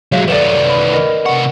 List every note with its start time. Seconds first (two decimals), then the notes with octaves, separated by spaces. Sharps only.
0.12 F#3 G#3 C#5 E5 F5
0.28 D#3 B3 A4 B4 D5 E7 F#7
0.70 B5
0.93 A#4 D#5
1.26 C3 F#5 C#6